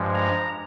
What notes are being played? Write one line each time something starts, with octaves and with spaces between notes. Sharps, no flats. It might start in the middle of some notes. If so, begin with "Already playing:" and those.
Already playing: G2 F3 G#3
A#5